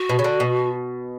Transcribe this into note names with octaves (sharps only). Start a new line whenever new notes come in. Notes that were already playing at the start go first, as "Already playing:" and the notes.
Already playing: F#4
B2
C#3
D3
B2